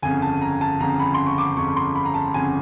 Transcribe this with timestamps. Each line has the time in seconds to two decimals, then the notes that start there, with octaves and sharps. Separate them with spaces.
0.02 G1 F2 C#3 G#5
0.22 A5
0.42 A#5
0.61 A5
0.80 G1 F2 C#3 A#5
1.00 B5
1.14 C6
1.26 C#6
1.38 D6
1.56 G1 F2 C#3 C#6
1.76 C6
1.96 B5
2.05 A#5
2.14 A5
2.34 G1 F2 C#3 G#5